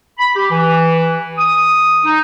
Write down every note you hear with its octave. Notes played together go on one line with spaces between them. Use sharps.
B5
G4
E3
D#6
D#4